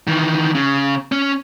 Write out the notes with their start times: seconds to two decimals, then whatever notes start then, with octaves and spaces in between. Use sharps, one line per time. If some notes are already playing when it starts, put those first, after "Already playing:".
0.07 D#3 E3
0.55 C#3
1.12 C#4